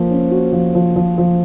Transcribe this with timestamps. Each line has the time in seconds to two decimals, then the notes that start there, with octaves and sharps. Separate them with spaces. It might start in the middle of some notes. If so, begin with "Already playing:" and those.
Already playing: F3 A#3
0.11 C#4
0.31 F#4
0.53 F3
0.75 F3
0.96 F3
1.18 F3